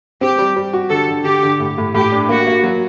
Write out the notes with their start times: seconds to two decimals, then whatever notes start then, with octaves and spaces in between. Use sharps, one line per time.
0.21 C4 G4
0.38 G3
0.56 G3
0.73 F#4
0.90 D3 A4
1.08 D3
1.25 D3 G4
1.43 D3
1.60 A2
1.78 A2
1.95 A2 G4
2.12 D4
2.29 A#3 F#4
2.47 A#3
2.64 F#3